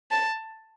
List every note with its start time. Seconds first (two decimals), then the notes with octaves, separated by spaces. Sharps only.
0.11 A5